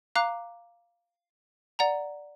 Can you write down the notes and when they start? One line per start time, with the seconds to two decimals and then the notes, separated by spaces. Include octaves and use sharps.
0.15 F5 A#5 D6 F#6
1.79 D5 F#5 A#5